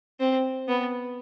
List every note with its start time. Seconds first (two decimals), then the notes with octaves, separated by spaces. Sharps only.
0.20 C4
0.68 B3